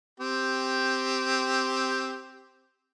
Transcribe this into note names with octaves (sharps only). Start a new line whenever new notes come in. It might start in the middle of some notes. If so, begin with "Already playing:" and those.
C4 G4